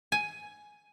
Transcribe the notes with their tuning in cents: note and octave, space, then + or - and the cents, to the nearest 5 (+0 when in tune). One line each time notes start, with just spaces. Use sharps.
G#5 +5